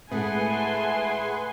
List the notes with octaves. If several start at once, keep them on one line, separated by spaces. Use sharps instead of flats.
A2 G#3 A3 G#4 B4 F#5 G#5 C6